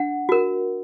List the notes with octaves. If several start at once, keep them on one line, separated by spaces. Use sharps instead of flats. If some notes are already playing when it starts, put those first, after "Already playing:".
Already playing: D4 F#5
F#4 A#4